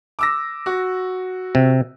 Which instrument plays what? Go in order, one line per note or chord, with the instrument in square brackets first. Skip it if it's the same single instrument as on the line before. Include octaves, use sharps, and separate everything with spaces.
[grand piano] D6 E6 A#6
F#4
[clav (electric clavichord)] C3